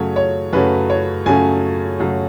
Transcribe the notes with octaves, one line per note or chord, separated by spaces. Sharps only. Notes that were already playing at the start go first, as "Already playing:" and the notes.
Already playing: F#2 C#3 F#3 A3 C#5
C#5
F#2 C#3 F#3 A3 B4
C#5
F#2 C#3 F#3 A3 G#5
F#2 C#3 F#3 A3